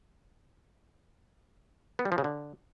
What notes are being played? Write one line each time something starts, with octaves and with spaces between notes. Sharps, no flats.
B3
G3
F3
C#3
D3